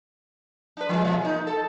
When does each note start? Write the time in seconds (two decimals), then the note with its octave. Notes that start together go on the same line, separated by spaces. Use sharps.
0.77 D4 B4
0.89 F3 G3 G#3
1.05 B2 F3
1.21 A#3 D#4
1.47 A4